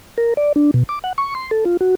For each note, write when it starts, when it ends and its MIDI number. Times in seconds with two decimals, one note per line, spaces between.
0.18 0.34 70
0.37 0.52 74
0.56 0.71 62
0.74 0.83 47
0.89 0.99 86
1.04 1.13 78
1.18 1.34 85
1.35 1.51 84
1.51 1.64 69
1.65 1.77 65
1.81 1.95 66